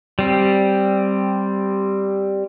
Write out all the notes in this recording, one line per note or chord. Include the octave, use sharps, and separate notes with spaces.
G3 C4